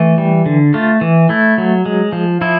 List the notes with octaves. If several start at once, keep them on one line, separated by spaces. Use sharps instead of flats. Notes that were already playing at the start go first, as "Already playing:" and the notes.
Already playing: E3 A3
G3
D3
A3 F4
E3
A3 E4
F#3
G#3
F3
F3 E4